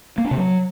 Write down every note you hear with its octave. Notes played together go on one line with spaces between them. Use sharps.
A#3
D4
C3
F#3